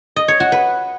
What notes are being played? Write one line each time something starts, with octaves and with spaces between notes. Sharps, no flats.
D#5
C#5
F#4
B4